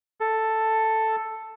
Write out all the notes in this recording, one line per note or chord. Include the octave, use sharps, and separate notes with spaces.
A4